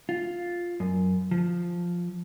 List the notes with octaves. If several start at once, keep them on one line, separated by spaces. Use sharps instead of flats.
F4
F#2
F3